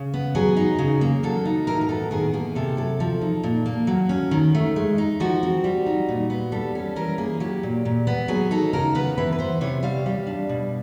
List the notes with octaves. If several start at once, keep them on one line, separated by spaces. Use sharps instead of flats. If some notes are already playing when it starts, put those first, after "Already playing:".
Already playing: C#3
B3
F#3 G#4
D#4
C#3
A#3
F#3 A4
D#4
A2 A#4
A#4
B3 A4
D#3 G#4
A#3 G#4
C3 A4
F#3 A4
F3 A4
D#4
A#2
A#3
F#3
C#4
D#3
A3
G#3
D#4
F3 F#4
C4
G3
D#4
A#2
B3
G3 A4
C#4 A4
E3 A#4
A#3 G#4
F#3 G4
A#2
A#2
B3
F#3 G#4
D#4 A4
C#3 A#4
B3 B4
E3 B4
B4
B3 C5
C3 C#5
G3 F5
G3
D4
B2